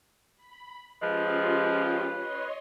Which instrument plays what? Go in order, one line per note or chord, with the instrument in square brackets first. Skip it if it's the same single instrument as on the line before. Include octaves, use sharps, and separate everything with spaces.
[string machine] B5
[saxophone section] F3 G#3 [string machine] C#4 F4 G4 [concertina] B4
[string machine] C#5 D#5 C6